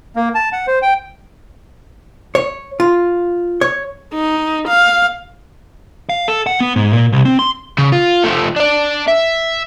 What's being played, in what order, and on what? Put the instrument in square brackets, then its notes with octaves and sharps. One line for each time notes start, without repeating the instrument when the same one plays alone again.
[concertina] A#3
A5
F#5
C5
G5
[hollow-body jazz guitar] C#5
F4
C#5
[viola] D#4
F5
[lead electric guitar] F5
A4
F#5
B3
G#2
A#2
C2
C4
C6
[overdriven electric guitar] C#3
F4
F3 A3
D4 D5
E5